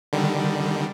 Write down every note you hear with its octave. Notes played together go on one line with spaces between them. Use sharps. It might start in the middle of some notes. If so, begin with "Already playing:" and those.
D3 D#3 G3